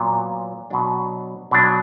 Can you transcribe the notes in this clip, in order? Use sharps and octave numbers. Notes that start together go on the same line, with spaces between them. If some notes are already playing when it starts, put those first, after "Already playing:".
Already playing: A#2 F#3 B3
B2 F#3 D4
B2 F#3 D4